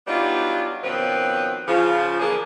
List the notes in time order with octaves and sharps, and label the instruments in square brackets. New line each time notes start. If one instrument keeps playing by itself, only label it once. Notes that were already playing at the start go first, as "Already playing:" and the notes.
[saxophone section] F#3 G3 B3 D4 D#4 F4
B2 D#3 F3 C4 C#4 B4
C#3 F3 F4
E3 A#3 D4 G#4